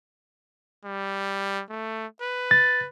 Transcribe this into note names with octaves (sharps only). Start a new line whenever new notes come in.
G3
A3
B4
A6